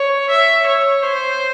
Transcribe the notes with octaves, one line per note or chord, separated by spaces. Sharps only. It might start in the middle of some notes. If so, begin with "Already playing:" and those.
Already playing: C#5
E5
C#5
C5